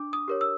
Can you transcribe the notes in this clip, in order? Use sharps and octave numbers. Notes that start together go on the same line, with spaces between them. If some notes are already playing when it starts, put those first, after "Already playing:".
Already playing: D4 D6
D#6
G4 A#4 C#5
E6